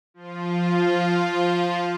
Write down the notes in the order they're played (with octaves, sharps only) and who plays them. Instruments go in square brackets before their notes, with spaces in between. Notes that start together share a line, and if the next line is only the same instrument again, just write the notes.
[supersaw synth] F3 F4